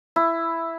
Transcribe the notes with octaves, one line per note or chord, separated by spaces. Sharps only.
E4